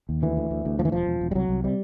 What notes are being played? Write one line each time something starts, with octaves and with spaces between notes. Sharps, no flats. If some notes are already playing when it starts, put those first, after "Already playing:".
D#2
D2 E3
D2
D2
D2
D#2 F3
E3
E1 F3
E1
E1
G3
C2 F#3
C2
C3 G3